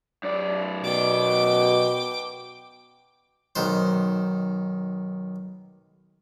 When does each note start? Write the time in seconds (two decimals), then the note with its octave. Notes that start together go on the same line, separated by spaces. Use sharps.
0.24 F#2 D5
0.84 B2 G5 D6
3.56 B1 D#3 C5